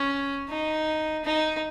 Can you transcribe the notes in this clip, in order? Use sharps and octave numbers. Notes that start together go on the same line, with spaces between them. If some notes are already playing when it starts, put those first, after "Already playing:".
Already playing: C#4
D#4
D#4